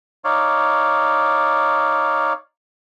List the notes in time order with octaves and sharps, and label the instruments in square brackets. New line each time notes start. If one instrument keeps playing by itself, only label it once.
[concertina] D#4 C#5 D5 F5